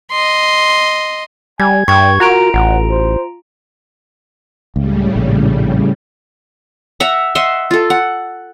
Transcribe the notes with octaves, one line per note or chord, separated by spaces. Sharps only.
D#5 C6
G3 G#5 G#6
G2 G5 C#6 G#6
F4 F#4 A#4 A#5 D7
A1 F#5
C5
C#2 A2 C#3 G3
A#1
E5 F#5 A#5
D#5 E5 F#5 C6
F4 A4
F#5